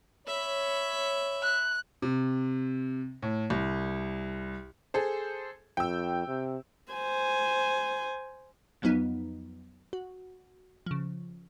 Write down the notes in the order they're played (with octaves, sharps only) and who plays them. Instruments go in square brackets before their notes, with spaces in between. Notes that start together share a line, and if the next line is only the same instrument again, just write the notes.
[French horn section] C#5 [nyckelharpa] E5 B5
[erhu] F#6
[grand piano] C3
A2
C2
[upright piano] G#4 A4 C5
[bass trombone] F2 [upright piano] G5 E6
[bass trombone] C3
[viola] C5 G#5
[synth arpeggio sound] F2 F3 F#3 B3 D#4
F#4
C#3 F3